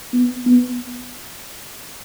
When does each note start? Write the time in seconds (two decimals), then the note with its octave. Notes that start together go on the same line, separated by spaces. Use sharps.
0.13 B3
0.46 B3